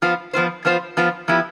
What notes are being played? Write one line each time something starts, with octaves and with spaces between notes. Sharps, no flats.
F3 B3 F4 C5
F3 B3 F4 C5
F3 B3 F4 C5
F3 B3 F4 C5
F3 B3 E4 G4 B4